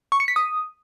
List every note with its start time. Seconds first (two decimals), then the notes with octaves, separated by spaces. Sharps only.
0.12 C#6
0.20 C#7
0.28 B6
0.36 D#6